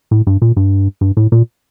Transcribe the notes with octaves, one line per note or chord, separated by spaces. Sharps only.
A2
G2
A#2
G2
G2
A2
A#2